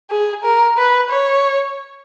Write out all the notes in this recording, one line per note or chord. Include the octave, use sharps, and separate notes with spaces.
G#4
A#4
B4
C#5